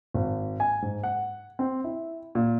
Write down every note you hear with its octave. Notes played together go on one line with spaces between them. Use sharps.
G#1
G#5
G#2
F#5
C4
E4
A#2